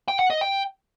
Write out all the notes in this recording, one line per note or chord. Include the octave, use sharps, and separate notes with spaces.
G5
F#5
D#5
G5